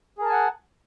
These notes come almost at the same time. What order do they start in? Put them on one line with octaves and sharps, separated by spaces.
G#4 A#4 A5 G#5 F#5